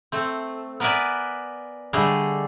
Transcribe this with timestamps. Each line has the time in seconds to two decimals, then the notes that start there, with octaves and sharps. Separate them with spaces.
0.12 A3 C4
0.80 B3 A#4 B4 D5 E5 G#5
1.93 D3 G3 A3 G#4 D#5